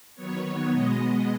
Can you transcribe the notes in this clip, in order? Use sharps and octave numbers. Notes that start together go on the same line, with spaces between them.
D#3 F#3 B3 C#5
B2 G#3 B3 D#5